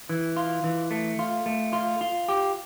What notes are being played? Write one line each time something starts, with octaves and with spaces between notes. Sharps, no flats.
E3
F4
E3
A3
F4
A3
F4
F4
G4